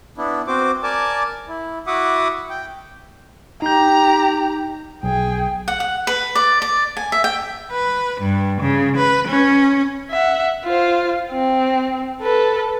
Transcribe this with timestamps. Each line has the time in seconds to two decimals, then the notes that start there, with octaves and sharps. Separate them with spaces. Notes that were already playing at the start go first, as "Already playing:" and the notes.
0.17 B3 D4 E4
0.47 C4 F#4 C5 D6
0.83 A#4 D5 G#5 A5 D6
1.48 E4
1.87 E4 F#4 E5 F#5 D6 D#6
2.50 G5
3.62 D#4 G4 A#5 G6
5.03 B1 G#4 G5
5.68 F#5
5.80 F#5
6.07 B4
6.35 D5
6.62 D5
6.97 G#5
7.12 E5
7.24 G5
7.72 B4
8.21 G2
8.61 C#3
8.97 B4
9.28 C#4
10.11 E5 F#5
10.64 F4 C5
11.31 C4
12.21 A4 B4